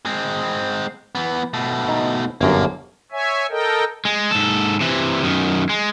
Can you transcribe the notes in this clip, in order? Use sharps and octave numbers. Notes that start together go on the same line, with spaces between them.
G#3 C4
E3 B3
B2 A3
D#4
G1 F#2 A#3 D4
C#5 E5 G#5
A4 A#4 D#5 G5
G#3
G#2 A4
C3 E3
F#2 D#3
G#3